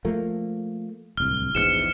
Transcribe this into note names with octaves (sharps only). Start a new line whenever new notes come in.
F3 A3 A#3
D1 C2 F6
A#1 E2 G#2 F6 C#7 E7